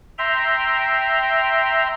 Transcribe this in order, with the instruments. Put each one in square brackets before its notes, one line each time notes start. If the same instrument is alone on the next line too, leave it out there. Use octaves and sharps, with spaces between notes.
[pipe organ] E5 G5 A#5 C6